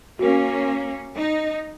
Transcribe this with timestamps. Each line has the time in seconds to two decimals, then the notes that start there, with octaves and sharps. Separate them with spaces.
0.19 A#3 C#4 F#4 A#4
1.16 D#4